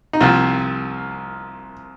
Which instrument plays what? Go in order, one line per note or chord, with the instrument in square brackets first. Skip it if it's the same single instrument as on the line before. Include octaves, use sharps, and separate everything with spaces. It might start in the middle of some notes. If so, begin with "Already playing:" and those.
[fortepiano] D#4
C2 C3 F3 A#3 F4